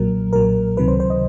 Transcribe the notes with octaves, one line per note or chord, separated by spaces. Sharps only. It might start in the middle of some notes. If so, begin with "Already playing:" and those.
Already playing: B1 A#2 F#3 A#4
B1 A#2 F#3 A#4
C#2 C3 D#3 F#3 B4
C5
C5
D#5